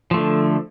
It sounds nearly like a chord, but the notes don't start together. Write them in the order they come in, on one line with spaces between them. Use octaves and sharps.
F3 A3 D3